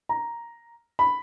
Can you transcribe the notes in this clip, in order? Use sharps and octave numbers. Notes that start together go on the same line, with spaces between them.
A#5
B5